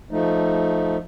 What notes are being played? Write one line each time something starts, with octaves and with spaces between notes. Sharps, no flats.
F3 A3 D#4